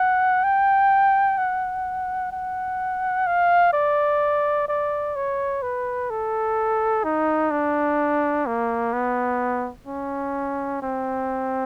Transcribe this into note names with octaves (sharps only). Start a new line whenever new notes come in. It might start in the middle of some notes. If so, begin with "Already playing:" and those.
Already playing: F#5
G5
F#5
F#5
F5
D5
D5
C#5
B4
A4
D#4
D4
A#3
B3
C#4
C4